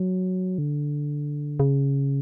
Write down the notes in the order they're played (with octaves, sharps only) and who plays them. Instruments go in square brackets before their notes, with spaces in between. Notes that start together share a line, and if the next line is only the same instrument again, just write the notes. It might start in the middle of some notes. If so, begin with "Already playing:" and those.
Already playing: [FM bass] F#3
D3
C#3